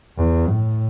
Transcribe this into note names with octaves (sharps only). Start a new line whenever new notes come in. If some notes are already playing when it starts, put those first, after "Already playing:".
E2
A2